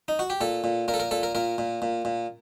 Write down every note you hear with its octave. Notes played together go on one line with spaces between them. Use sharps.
D#4
F#4
G4
A#2 A4
A#2
A#2 A#4
A4
A#4
A#2 A4
A#4
A#2 A#4
A#2
A#2
A#2